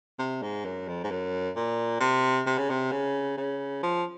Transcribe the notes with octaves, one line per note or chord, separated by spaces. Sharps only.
C3
G#2
F#2
F2
G#2
F#2
A#2
C3
C3
C#3
C3
C#3
C#3
F3